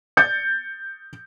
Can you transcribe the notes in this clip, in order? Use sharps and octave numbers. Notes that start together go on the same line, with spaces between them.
G6 A6 C#7